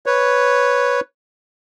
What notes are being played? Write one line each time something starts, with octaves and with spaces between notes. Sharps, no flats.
B4 C#5